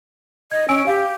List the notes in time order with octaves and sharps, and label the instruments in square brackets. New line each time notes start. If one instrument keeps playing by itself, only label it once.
[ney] D#5 [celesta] G#6
[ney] C#4 [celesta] G#5 E6 D7
[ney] G4 [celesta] F5